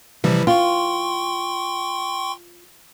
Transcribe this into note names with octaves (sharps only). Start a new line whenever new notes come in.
C3 E3 F3 G3
F4 G5 C6 C#6